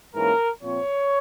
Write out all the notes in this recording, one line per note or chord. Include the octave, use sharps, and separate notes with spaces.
G#2 E3 A#3 C#4 A#4
A#2 F3 C4 C#5